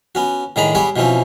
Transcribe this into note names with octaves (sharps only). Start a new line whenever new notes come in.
B3 C#4 F#4
A2 D3 D#3 G#4 A#5 B5
G3 B3 G#4 B4 C#5
B2 E3 F3 C4 C#4